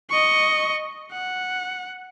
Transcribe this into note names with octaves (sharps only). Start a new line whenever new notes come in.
D#5 C#6
F#5